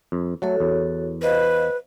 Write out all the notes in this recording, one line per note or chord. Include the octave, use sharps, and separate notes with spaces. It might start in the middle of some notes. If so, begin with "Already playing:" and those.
F2
F#3 A3 F#4 A4 C#5
E2
B4 C5 D#5 F5